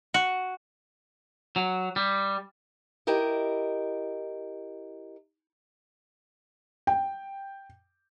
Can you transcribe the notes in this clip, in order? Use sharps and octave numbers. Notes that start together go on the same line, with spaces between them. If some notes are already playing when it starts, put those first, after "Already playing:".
F#4
F#3
G3
E4 G4 A#4 D#5
G5